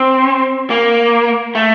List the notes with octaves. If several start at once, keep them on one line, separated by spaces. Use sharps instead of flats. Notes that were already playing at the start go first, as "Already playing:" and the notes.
Already playing: C4
A#3
A3